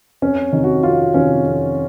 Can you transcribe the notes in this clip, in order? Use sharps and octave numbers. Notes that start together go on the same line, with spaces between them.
F2 C#4
C3 D#3
F#4
F2 F4
C3 D#3 C#4
F2